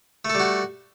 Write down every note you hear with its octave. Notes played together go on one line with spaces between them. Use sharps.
G3 A3 F#4 A4